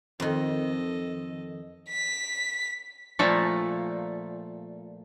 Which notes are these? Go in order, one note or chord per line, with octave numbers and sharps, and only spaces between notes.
F2 D#3 A4 D#5
B6
A#2 F3 A3